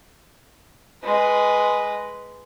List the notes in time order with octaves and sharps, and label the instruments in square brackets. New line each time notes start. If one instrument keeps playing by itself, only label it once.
[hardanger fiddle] G#3 B4